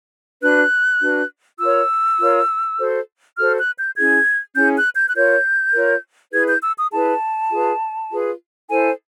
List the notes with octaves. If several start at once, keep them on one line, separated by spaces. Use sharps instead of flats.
D4 F#4 B4 F#6
D4 F#4 B4
F4 A#4 C#5 E6
F4 A#4 C#5
F#4 A4 C5
F#4 A4 C5 F6
F#6
G6
C#4 E4 G#4 G#6
C#4 E4 G#4 G6
F#6
G6
F#6
F4 A#4 C#5 G6
F4 A#4 C#5
E4 G#4 B4 G#6
G6
E6
D#6
E4 G#4 B4 A5
F4 G#4 B4
F4 G#4 B4
E4 A4 C5 G#5